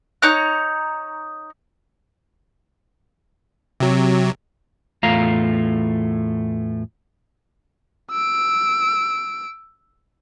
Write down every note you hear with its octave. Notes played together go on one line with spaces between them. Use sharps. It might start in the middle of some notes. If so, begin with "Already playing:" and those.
D#4 C#5 A#5 F#6
C3 F#3
E2 A2 A3 F4 F5 A#5
E6 D7